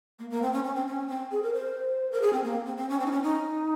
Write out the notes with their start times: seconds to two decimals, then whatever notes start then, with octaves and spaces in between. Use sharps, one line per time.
0.19 A#3
0.30 A#3
0.42 C4
0.53 C#4
0.64 C#4
0.75 C4
0.87 C#4
1.09 C4
1.32 G#4
1.43 A#4
1.54 C5
2.12 A#4
2.22 G#4
2.33 C4
2.44 A#3
2.66 C4
2.77 C4
2.89 C#4
3.00 C4
3.06 D#4
3.12 C#4
3.23 D#4